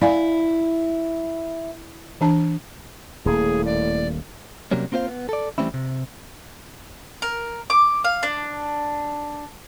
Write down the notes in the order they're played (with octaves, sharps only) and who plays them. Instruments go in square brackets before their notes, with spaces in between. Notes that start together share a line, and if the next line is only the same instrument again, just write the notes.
[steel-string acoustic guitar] E4 [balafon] D5 F5 G#5
[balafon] E3 D4 A5
[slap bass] D#1 A#3 [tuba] A2 [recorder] G#4
[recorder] D5
[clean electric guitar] C3 F#3 G3 A#3 C#4
A#3 C4 F4 B4 C5 F5
B3
A4 D5
E3 G3 A3 C4 C#4 E4
C3
[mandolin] A#4
D6
F5
D4